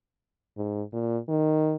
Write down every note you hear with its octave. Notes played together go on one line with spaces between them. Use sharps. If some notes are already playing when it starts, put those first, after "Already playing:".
G#2
A#2
D#3